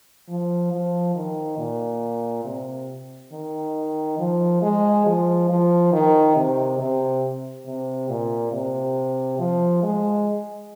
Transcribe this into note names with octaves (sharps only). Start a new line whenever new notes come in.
F3
F3
D#3
A#2
C3
D#3
F3
G#3
F3
F3
D#3
C3
C3
C3
A#2
C3
F3
G#3